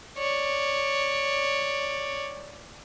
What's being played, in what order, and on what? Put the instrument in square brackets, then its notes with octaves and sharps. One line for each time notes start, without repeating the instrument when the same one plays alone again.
[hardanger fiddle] C#5 D5